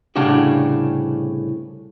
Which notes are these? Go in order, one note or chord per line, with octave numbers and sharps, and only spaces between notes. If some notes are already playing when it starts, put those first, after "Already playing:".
C2 A2 C#3 D4 F#4 G4